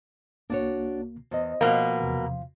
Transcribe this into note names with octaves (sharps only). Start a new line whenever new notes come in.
C2 A#3 D4 F#4 C#5
E2 C5 D#5
B2 F3 A#3 F5
E2 C3